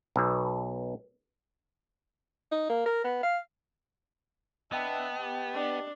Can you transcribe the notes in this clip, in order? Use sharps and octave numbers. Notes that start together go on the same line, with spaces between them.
B1 B2
D#4
A#3
A#4
B3
F5
B3 D4 B4 D#5 E5 G5 A5
G4
D4